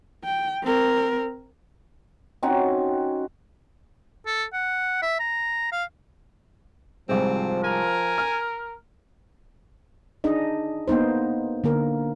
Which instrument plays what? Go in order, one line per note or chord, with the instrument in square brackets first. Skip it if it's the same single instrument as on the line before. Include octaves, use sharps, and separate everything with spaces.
[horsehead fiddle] G5
C4 A#4
[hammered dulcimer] C4 C#4 D#4 F#4
[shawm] A4
F#5
E5
A#5
F5
[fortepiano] C2 G#2 [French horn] F3 [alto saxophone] C4
[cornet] A#4 [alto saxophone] G#5
[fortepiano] F6
[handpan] D4 D#4 G#4 D#5
A#3 B3 D#4 C5
D3 A#3 A#4